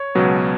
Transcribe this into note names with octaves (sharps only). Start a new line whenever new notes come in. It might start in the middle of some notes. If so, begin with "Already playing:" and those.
Already playing: C#5
C#2 B2 F#3 B3